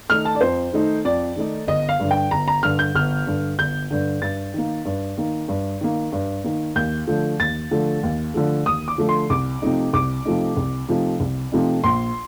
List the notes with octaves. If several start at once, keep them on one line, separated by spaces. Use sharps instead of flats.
D#3 A3 D#4 F6
A5
D5
F2 C5
D#3 A3 D#4
F2 D5
D#3 A3 D#4
G1 D#5
F5
G2 D3
G5
G1 A#5
A#5
G2 D3 F6
G6
G1 F6
G2 D3
G1 G6
G2 D3
G2 A6
D#3 A#3
G2
D#3 A#3
G2
D#3 A#3
G2
D#3 A#3
D#2 G6
D3 F3 A3
D#2 A6
D3 F3 A3
D#2
D3 F3 A3
D#2 D#6
D6
D3 F3 A3
C6
C2 D6
C3 F3 A3 D#4
C2 D6
C3 F3 A3 D#4
C2
C3 F3 A3 D#4
C2
C3 F3 A3 D#4
A#1 C6